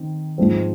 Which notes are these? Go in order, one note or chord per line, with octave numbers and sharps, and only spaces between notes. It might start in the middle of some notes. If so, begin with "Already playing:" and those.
Already playing: D#3 C4
G#2 F3 C4